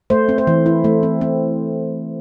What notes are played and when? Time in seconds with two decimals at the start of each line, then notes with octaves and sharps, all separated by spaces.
0.10 A3 C5
0.29 C4
0.38 C5
0.47 E3
0.66 E4
0.84 A3
1.03 C4
1.21 C4